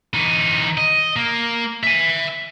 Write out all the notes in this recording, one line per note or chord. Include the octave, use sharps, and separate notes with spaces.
E3 D#4
D#5
A#3
E5 G#5